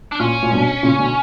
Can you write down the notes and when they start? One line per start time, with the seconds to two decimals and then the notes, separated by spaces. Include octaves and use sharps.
0.12 D4
0.20 A#2 C#4
0.43 A#2
0.52 G2 B2
0.83 A#2 C#3
0.99 B2 D3